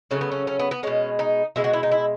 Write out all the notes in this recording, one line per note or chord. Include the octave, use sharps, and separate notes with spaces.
C#3 F#3 A3 C#4
B3
C#4
C#4
B3
B3
B2 G#3 C#4
D#4
B2 G#3 E4
F#4
E4
D#4
E4